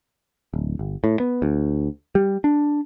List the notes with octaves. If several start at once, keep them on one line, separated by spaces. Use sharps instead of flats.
D1
G1
A2
B3
D2
G3
D4